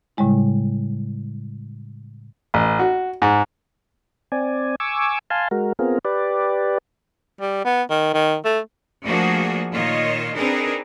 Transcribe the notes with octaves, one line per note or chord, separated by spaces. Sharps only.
A2 C#3 G3 G#3 E4
A1
F#4
G#2
C4 D5 G#5
G#5 C#6 D6 E6
F5 G#5 A5 C6
G#3 F#4 A#4
B3 C4 F4 G#4 A#4
G4 B4 D5
G3
B3
D#3
D#3
A3
F3 A3 A#3 D4 F#4 G#4
A#2 D#3 F4 C#5 D#5
C4 D4 D#4 G#4 A#4 B4